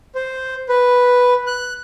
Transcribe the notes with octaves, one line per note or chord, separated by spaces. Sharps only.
C5
B4
F#6